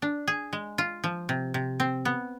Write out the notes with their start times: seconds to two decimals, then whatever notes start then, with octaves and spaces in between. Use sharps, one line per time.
0.02 D4
0.28 G#4
0.53 G#3
0.78 F4
1.04 F3
1.29 C3
1.54 C3
1.80 C4
2.05 B3